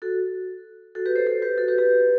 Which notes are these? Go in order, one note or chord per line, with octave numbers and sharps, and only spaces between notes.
F#4 A4
F#4 A4
G4 B4
A4 C5
A4 C5
G4 B4
F#4 A4
G4 B4
G4 B4